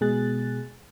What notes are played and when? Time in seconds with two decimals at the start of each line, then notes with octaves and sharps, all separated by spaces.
0.01 B2 G#3 G#4 F#6 A6